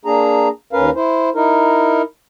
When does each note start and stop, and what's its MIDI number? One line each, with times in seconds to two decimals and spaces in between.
0.05 0.48 58
0.05 0.48 62
0.05 0.48 68
0.05 0.48 82
0.73 0.90 39
0.73 0.90 61
0.73 0.90 70
0.73 0.90 71
0.73 0.90 77
0.95 1.30 64
0.95 1.30 72
1.35 2.02 63
1.35 2.02 64
1.35 2.02 70